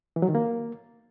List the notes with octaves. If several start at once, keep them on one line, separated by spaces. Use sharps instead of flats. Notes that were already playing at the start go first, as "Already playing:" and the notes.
E3
F#3
D#3
A#3